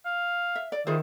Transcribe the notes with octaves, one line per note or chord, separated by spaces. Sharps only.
F5
E5
D5
D#3 E4 F4 G#4 C5